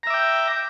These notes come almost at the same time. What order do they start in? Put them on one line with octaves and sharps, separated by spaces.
A#5 E5 D6 G5